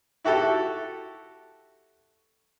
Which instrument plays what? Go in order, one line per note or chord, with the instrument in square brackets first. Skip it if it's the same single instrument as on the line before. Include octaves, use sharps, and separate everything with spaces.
[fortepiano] E4 F#4 G4 A4